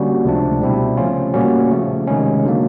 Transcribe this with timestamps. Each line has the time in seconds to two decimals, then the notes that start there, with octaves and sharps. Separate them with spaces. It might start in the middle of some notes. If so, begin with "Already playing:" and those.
Already playing: D3 G3 A#3 C#4 F#4
0.25 C#2 C3 F3 A3 D4
0.61 B2 G3 C4 E4
0.97 C#3 F3 A3 C#4 F4
1.34 A#2 G3 A#3 C#4 F#4
1.71 C#3 F3 A3
2.08 C3 D#3 G#3 C#4
2.45 D3 F#3 A#3